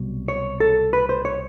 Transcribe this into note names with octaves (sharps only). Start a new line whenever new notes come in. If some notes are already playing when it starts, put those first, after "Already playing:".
Already playing: C2 B2 F#3
C#5
A4
B4
C5
C#5